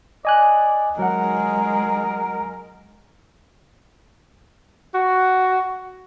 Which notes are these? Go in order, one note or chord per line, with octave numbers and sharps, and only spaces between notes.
D5 D#5 G#5 F#6
F#3 G#3 A#4 F#5
F#4